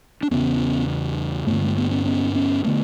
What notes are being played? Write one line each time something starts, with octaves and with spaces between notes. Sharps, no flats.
D4
E2 C#3 B3 C#4
G2 D3 A3 B3
G#3 A#3
A3 B3
B3 C#4
B3 C#4
B3 C#4
D3 A3 B3